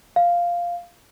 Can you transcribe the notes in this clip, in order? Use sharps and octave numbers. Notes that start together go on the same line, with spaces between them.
F5